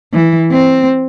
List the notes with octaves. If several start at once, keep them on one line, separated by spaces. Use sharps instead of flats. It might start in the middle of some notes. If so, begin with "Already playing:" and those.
E3
C4